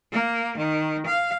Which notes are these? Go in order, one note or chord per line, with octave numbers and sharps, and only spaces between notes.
A#3
D#3
F5